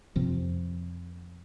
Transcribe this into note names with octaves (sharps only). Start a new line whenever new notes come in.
F2 C3 F3